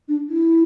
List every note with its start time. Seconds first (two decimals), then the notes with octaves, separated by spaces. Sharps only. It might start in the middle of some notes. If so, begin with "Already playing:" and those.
0.08 D4
0.29 E4